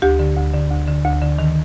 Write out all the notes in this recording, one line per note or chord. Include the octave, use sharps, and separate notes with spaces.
D2 G4
D3
D2
D3
D2
D3
D2
D3
D#3